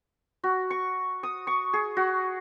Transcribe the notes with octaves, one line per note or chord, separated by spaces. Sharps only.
F#4
C#6
D#6
C#6
G#4
F#4